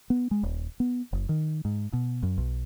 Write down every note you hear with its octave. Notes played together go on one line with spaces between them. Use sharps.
B3
G#3
D#1
B3
F#1
D#3
G#2
B2
F#2
B1